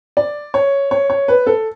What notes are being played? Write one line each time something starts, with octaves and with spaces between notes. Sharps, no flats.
D5
C#5
C#5
C#5
B4
A4